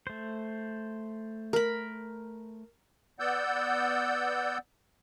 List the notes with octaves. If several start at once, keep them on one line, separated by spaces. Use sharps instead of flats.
A3 C5
A#4 B5
B3 D5 F#5 E6 G6